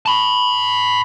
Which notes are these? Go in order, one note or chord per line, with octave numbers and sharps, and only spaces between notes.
A5 B5